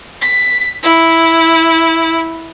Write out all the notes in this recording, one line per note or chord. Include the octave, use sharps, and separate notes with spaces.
B6
E4